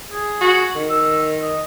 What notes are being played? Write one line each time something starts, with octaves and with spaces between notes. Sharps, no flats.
G#4
F#4
D#3
E6
D#5